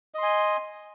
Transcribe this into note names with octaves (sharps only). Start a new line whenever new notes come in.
D#5 G#5 C6